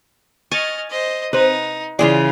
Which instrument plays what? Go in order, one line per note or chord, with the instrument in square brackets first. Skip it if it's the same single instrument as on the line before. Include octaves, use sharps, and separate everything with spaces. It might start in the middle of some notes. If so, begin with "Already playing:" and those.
[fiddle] D#5 F6 [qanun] G#5 [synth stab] C#6 G#6 A6
[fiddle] C5 D#5
[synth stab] C3 C4 [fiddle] D#4 [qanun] B4
[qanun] C#3 E3 G#4 [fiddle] F4 [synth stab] D5 C6